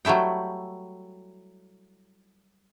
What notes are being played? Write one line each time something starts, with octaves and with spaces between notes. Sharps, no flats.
F#3 G3 A3 E4 G5